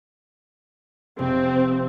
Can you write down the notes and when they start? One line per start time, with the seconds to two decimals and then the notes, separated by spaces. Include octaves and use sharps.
1.19 F1 C3 C4